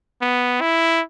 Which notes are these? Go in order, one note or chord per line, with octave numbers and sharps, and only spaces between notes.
B3
E4